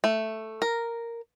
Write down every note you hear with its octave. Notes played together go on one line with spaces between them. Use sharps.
A3
A#4